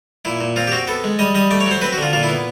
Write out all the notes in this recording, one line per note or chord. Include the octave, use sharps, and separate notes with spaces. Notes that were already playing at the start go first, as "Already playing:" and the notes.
A#2 E4
A#2
C4 F4
G4
C4 F#4
B3 A4
G#3
G3 D#5
G3 D#5
A3 D5
C#5
F#3 C5
C4 B4
F#4
D3 F4
A#2 F4
E4
B3